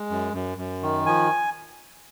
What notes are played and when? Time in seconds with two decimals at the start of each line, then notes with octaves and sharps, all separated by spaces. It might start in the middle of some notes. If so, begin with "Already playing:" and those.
Already playing: G#3
0.10 F#2
0.34 F#2
0.58 F#2
0.83 D#3
1.06 F3 G#5